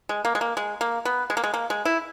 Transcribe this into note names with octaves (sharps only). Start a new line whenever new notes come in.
G#3
A#3
G#3
A#3
G#3
A#3
B3
G#3
A#3
G#3
A#3
G#3
E4